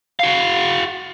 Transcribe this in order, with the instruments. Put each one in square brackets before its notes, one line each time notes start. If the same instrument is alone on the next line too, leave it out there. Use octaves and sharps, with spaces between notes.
[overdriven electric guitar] F#4 F5